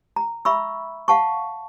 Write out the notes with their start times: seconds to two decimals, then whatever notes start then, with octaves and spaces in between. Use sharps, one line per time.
0.16 A#5
0.45 E5 B5 C#6 E6
1.08 F5 F#5 A5 C#6